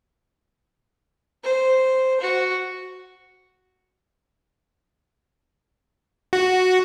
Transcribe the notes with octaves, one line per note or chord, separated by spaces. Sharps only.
C5
F#4
F#4